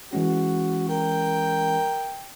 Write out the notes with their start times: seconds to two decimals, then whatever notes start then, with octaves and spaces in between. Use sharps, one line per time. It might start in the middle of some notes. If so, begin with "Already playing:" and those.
0.13 E3 G#3 C#4 F#4
0.90 A#4 G5